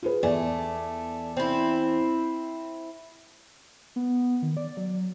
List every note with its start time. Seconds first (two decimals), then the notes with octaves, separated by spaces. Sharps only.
0.03 F4 G#4 B4
0.23 E2 A3 D5 G#5
1.37 C4 E4
3.96 B3
4.42 D#3
4.57 D5
4.77 F#3